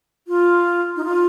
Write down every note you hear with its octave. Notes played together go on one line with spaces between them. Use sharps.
F4
D#4
F4